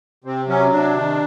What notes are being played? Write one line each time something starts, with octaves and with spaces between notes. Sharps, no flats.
C3 C4
F#3 C#4
C3 D4
D#3